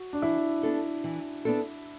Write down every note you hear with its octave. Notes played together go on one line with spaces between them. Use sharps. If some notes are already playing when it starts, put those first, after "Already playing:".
Already playing: F#4
D4
E3 E4
B3 D4 A4
E3
B3 D4 A4